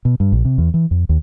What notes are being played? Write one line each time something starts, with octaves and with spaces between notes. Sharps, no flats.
B2
G2
A#1
C3
E2
E3
F2
D#2